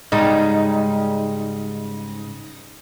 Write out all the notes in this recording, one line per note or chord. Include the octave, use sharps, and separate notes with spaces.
G#2 C#3 G3 D#4